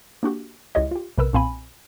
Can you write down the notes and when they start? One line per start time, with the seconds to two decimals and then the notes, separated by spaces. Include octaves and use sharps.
0.23 A#3 D4 F#4 G4
0.75 C#2 E4 G4 C#5 D#5
0.91 F4 G4
1.18 B1 C3 A#4 B4 E6
1.33 B1 A#2 C4 F5 G#5 B5